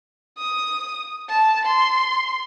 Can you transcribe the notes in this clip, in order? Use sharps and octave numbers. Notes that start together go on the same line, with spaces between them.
D#6
A5
C6